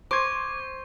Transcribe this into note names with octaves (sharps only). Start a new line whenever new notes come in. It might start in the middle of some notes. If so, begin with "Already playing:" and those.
C5 C#6 D6 G#6